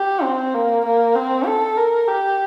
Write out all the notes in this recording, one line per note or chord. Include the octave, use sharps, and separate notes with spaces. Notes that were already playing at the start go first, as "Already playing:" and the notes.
Already playing: G4
C4
A#3
A#3
C4
A4
A#4
G4